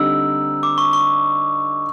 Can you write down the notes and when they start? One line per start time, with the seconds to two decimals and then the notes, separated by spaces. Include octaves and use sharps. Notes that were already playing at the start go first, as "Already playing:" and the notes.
Already playing: D3 G3 C4 D#4 E6
0.63 D6
0.78 C#6
0.93 C#6